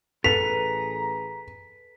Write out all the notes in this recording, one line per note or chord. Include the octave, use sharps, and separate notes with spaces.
A1 G#4 A4 B4 A#5 B6 F7